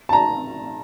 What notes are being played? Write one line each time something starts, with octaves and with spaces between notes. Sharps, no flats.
A5
A#5